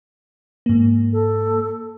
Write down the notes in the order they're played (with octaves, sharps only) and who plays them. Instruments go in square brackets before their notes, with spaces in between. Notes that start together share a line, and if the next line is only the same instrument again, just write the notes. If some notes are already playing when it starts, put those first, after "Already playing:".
[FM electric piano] G#2 A#3
[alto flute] A4